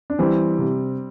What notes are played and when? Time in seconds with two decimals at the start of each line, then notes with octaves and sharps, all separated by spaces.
0.10 D4
0.19 E3 G3 C4
0.59 C3